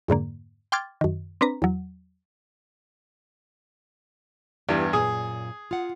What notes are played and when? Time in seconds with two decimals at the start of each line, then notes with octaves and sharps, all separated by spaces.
0.08 F2 G#2 D3 A#3
0.72 G5 C6 D6 F6 G#6 A6
1.01 F#2 D#3
1.41 C4 D4 B4 A#5
1.62 E2 F#3
4.69 E2 G2 E4 G4 D5
4.93 F#2 A#2 G#4
5.71 F4 F#5